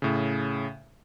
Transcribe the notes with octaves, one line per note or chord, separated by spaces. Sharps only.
A2 C#3